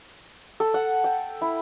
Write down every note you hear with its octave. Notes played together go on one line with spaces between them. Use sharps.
A4
F#5
G5
E4